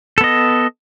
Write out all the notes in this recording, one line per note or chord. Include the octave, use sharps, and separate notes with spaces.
B3 A4 D#5